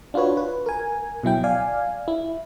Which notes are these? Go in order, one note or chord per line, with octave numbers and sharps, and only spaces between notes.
D4 F4 F#4 B4 C#5
B4
A#4 G#5
B2 F#3 E4 G5
D5 F5 G#5
E4